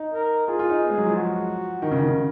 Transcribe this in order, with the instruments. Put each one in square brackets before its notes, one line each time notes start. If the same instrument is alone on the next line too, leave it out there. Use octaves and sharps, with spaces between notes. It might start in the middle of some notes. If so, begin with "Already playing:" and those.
Already playing: [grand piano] D#4
[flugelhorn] A#4
[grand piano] F4 [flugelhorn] G#4
[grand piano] F4
D#4
B3
G#3
F#3
F3
[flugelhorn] F#4
[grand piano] D#3
C#3
D#3
C#3